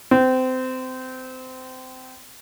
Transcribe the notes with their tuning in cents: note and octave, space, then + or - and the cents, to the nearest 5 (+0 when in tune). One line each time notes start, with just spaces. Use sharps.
C4 -25